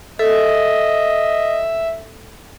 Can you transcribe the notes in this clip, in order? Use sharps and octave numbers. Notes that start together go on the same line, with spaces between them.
A4 D#5 E5